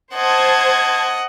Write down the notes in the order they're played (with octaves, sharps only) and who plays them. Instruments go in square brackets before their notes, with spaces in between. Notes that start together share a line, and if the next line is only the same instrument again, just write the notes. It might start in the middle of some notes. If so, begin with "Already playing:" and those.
[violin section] C5 A5 G#6 [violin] D#5 F#5